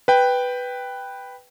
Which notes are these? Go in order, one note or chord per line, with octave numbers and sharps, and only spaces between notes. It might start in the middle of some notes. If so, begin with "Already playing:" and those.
B4 G5